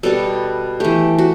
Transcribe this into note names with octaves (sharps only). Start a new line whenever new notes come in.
B2 G3 B3 A4
E3 A3 G4
F#4